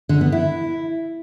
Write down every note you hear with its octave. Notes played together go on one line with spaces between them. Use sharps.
D3
B3
E4